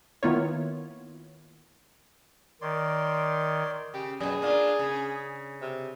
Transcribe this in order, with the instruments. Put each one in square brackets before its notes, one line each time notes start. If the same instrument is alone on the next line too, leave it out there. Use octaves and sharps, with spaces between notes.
[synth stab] D#3 A#3 B3 E4 F4 C#5
[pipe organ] D#3 [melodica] C#5 D5 C6
[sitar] C#3 [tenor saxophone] G4
[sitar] F#2 B2 [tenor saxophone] G#4
[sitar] A#3 D4 F4
C#3
[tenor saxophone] C3